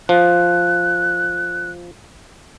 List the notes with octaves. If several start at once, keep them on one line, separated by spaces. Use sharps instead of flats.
F3 F#6